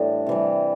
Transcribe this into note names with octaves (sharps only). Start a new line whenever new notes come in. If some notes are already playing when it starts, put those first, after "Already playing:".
Already playing: A2 E3 G3 D4
C3 E3 G3